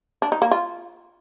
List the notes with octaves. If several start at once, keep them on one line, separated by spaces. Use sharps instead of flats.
D4
D#4
A#3
F4